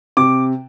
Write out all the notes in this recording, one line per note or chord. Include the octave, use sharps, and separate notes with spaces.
C3 D6